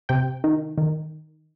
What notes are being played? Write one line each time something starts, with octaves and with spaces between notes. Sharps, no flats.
C3 G5
D#3
D#3